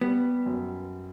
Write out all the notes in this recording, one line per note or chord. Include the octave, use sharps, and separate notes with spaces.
G3 B3
F#2